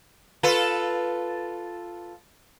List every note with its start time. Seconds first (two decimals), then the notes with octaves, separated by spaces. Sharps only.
0.43 F4 A4 B4